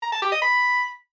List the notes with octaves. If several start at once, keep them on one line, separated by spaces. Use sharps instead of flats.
A#5
A5
G4
D#5
B5